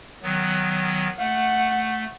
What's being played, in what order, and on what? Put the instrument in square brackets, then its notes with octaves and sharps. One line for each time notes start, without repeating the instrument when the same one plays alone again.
[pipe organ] D#3 F#3 B3
[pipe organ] A3 [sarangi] F#5